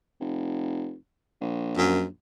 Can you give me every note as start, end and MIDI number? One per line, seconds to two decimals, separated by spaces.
0.20 0.95 29
1.41 2.10 34
1.78 2.04 42